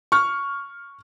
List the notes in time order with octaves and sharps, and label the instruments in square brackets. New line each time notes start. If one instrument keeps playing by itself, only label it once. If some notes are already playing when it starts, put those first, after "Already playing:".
[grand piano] C#6 F6